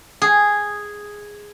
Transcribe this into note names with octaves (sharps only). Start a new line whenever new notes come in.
G#4